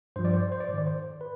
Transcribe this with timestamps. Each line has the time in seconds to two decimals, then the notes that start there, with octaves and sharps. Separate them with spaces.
0.16 G2 F3 C5
0.25 D5
0.33 C5
0.42 D5
0.52 C5
0.60 D5
0.68 G#2 C5
0.73 D#3
0.78 D5
0.87 C5
1.21 B4